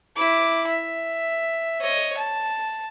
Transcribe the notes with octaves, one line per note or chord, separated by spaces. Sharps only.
E4 D6
E5
C#5 D#5
A5